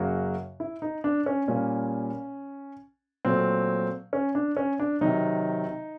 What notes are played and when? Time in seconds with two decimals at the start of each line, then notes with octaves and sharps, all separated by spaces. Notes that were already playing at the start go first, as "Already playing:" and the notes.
Already playing: F#2 C#3 F#3 A#3 F#4
0.60 E4
0.82 D#4
1.04 D4
1.26 C#4
1.48 A#2 G3 A#3 C#4
3.25 A#2 F#3 A3 C4
4.13 C#4
4.35 D4
4.57 C#4
4.80 D4
5.01 C3 D#3 F#3 D#4